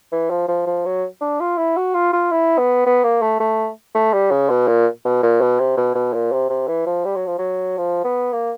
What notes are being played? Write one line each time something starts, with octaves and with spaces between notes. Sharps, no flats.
E3
F3
F3
F3
F#3
D4
F4
E4
F#4
F4
F4
E4
B3
B3
A#3
A3
A3
A3
G3
C#3
B2
A#2
B2
A#2
B2
C3
B2
B2
A#2
C3
C3
E3
F3
G3
F#3
F3
F#3
F3
B3
A#3